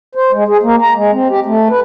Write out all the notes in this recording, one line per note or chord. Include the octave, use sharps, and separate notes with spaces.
C5
G#3
G#4
A#3
A#5
G#3
C4
G4
A3
B4